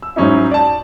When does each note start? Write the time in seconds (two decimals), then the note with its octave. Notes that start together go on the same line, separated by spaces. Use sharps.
0.02 E6
0.16 G#2 F#3 C#4 D#4 E4
0.51 D5 A5